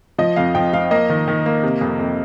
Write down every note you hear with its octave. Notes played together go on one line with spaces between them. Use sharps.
F3 D#5
F2 F5
F3 G5
F3 F5
A#3 D#5
D#3
D#3
A#3
C3
F2
F2